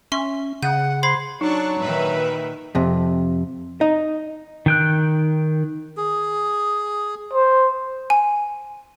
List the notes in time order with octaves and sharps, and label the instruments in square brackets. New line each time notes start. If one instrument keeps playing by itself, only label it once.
[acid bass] C#4 [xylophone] E5 C6 C#6
[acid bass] C#3 [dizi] F#5 [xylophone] G6 D#7
[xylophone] C5 B5 G#6 [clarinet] C6
[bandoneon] F#3 [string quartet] D4 [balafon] D#4 [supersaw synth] A5 C#6 F#6
[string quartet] A#2 D#3 [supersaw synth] B4 E5 B5
[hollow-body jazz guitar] F2 C3
D#4 D#5
[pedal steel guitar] D#3 G5 F#6
[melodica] G#4
[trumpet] C5
[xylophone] G#5